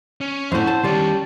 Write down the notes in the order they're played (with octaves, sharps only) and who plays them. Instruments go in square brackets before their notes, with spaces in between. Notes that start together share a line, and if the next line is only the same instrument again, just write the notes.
[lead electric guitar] C#4
[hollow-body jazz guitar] F2 A2 [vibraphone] E4 F#5 [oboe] C5
[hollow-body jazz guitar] A5
[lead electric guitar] D#3 C#5 [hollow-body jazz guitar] G3 [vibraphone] C#4 [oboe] A5